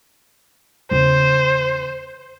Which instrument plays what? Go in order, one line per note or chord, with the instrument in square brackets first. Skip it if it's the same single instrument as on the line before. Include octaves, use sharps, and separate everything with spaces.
[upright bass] E2 C#3 [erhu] C5